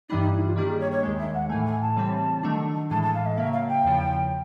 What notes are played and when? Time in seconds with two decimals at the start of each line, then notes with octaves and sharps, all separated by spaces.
0.09 G2 E3 G3 B3 D4 D#4
0.21 D#4
0.33 E4
0.45 F4
0.56 D#3 G3 A#3 D4 G4
0.68 G#4
0.80 C#5
0.91 C#5
1.03 D#2 D#3 G#3
1.19 E5
1.34 F#5
1.49 A2 E3 A3 G#5
1.66 G#5
1.82 A5
1.96 C#3 E3 G3 C4
2.43 D#3 F#3 A3 D4
2.91 A2 E3 G#3 A5
3.02 A5
3.14 F5
3.26 D#5
3.38 C#3 F#3 A#3 E5
3.53 F5
3.69 G5
3.84 E2 C#3 F3